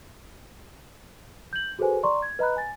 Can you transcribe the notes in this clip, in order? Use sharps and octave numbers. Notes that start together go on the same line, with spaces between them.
G6 F#7
F#4 G#4 A4 B4 C5 G#5
D5 A#5 C6 C#6
G#6
B4 D#5 A#5 B5 F#6
G#5 A6